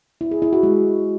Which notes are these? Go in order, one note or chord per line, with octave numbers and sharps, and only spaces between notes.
E4
G#4
E4
F#4
G#3